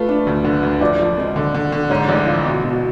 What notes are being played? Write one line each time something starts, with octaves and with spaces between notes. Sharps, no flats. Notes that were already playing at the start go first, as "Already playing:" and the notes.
Already playing: A3 F4 B4
D4
D2
D3
D2
F3 D5
F3
G#3
D3
D3
D3
G#2 C#5
A1 D5
F3 F5
B2
B2